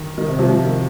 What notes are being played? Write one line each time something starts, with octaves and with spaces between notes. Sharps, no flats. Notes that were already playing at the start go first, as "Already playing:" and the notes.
Already playing: D#3
D#3
C3
C3 F3
C3 F3
D#3